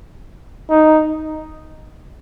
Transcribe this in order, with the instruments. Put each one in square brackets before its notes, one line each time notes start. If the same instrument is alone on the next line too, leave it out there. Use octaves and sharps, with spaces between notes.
[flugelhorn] D#4